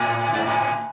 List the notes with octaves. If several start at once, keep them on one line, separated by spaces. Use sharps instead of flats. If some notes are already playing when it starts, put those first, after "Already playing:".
Already playing: A2
G#2
A2
A2